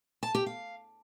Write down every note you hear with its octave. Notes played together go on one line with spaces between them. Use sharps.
A5
G4
F5